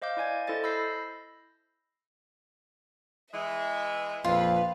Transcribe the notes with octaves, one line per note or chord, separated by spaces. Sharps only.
C5 D#5 F5 D6 G6
E4 D5 G#5 G#6
E4 A4 C5 D#5 A6
B5 E6 G6 A#6 C7
E3 G#3 E5
A#1 F2 F4 B4 F5